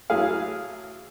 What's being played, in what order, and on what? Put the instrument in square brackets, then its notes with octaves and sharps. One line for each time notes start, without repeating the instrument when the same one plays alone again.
[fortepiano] A1 F#3 E4 G#4 F5